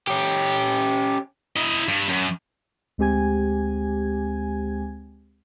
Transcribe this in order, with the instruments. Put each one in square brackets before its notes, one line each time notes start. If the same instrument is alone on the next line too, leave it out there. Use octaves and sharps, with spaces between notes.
[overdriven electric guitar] C#4 G4
[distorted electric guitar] E4 D#5
G2
F#2
[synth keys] D2 G#3 C4 G4 G#5 G#6